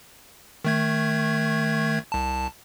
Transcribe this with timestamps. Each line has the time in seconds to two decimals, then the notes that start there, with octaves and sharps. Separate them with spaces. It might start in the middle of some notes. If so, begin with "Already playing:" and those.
0.65 D#3 A3 G#6
2.12 C2 A5